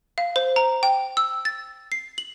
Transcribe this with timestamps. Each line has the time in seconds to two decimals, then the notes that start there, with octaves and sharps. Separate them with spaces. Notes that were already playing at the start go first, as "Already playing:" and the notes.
0.18 F5
0.36 C5
0.56 A#5
0.83 G5
1.17 E6
1.45 A6
1.92 C7
2.18 F#7